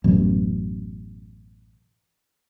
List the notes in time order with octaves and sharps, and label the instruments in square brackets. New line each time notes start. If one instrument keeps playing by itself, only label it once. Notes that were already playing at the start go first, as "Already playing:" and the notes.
[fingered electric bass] A1 F#2 B2